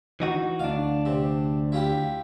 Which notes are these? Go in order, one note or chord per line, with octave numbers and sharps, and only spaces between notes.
E3 D#4 F#4
D2 D4 F5
C3
E4 F4 G4